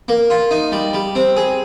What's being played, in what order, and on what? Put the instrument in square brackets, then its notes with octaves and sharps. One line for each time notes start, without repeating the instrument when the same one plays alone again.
[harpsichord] A#3
F4
D#4
G3
G3
C4
G#4